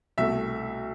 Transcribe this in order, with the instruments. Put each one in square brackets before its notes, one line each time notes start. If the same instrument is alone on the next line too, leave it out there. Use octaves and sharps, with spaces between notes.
[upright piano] C2 B2 A3 E5